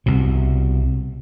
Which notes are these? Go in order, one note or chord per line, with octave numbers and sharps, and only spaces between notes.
C2 B2